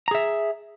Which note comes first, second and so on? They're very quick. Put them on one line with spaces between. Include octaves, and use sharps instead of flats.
A#5 G#4 E5